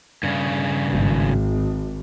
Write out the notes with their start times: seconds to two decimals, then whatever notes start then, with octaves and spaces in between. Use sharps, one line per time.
0.23 G2 C#3
0.91 G#1